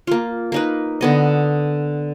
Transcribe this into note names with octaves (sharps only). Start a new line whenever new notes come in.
A#3 F4
A#3 D#4 B4
D3 B3 D#5